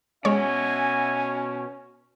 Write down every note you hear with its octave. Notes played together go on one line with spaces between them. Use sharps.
B2 G#3 C#4 F#4 C#5 E5 G#5